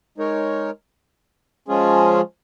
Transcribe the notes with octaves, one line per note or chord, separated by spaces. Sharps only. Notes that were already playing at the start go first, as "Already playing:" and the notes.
G#3 D#4 A#4 C#5
F3 G#3 C#4 F4 G#4